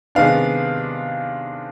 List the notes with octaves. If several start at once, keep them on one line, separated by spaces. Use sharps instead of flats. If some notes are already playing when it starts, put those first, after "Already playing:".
C3 D#3 G#3 B3 D4 F5